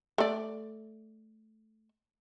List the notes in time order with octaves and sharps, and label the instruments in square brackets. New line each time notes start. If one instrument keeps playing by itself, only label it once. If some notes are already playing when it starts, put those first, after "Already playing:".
[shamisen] A3 D5